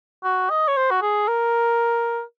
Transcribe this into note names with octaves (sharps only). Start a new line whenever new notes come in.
F#4
D#5
C#5
C5
F#4
G#4
A#4